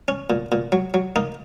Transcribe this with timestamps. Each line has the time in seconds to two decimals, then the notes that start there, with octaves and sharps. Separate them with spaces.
0.08 C#4
0.30 A#2
0.52 A#2
0.72 F#3
0.94 F#3
1.16 A#3 D#4